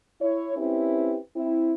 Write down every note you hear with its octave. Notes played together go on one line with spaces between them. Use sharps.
E4 C#5
C4 C#4 E4 G4 B4
C4 E4